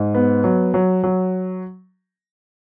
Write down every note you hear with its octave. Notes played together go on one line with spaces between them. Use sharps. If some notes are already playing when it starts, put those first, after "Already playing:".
Already playing: G#2
B3
F#3
F#3
F#3